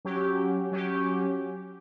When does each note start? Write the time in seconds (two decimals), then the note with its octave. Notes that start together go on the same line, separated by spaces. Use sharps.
0.05 F#3 C#4 G4
0.71 F#3 C#4 G4